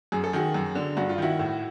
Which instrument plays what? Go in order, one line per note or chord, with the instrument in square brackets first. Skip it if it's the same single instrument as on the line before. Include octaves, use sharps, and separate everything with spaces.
[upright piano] F#2 G#4
A4
D#3 F#4 G#4
F#2
D3
G2 F#4
F4
D#3 E4 F#4
A2